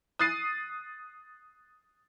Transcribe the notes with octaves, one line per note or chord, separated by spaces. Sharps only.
D#6 F#6 A6 C7 D#7